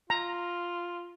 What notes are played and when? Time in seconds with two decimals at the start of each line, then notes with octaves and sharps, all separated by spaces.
0.10 F4 A#5